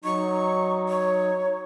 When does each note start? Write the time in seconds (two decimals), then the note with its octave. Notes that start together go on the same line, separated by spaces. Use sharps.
0.04 F#3 D#4 C#6
0.89 C#5